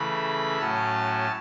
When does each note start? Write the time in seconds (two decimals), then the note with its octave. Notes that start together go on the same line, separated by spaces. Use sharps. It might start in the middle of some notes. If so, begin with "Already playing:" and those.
Already playing: C#3 E3 A3 B5
0.58 A2 F#3 C#4 A5